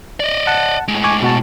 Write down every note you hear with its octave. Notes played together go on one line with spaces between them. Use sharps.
D5 D#5
F#5 A5
A2 G#3
G#5 C#6 D6
B2 F#4 A5